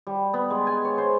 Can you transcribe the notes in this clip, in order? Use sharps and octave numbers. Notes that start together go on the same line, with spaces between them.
G3
B3
G#3
G#5
C#5
C5